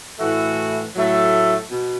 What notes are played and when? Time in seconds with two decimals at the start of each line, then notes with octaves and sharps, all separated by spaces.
0.19 A2 E3 A3 F#4
0.95 A2 F#3 A3
1.69 B2